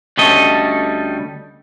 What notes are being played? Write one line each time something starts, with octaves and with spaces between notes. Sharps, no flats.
D2 G3 C#4 A4 D#5